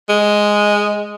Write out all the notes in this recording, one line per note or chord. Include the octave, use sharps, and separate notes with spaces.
G#3